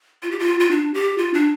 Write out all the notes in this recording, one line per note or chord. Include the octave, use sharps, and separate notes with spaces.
F4
G4
F4
F4
D4
G4
F4
D4